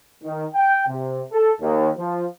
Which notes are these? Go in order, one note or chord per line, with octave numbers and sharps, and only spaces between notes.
D#3
G5
C3
A4
D#2
F3